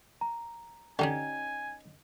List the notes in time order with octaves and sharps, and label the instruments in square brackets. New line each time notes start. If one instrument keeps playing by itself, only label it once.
[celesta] A#5
[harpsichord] D3 [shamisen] C#4 D#4 G4 [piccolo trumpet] G#5